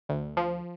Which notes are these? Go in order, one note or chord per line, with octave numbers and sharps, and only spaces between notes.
D2
F3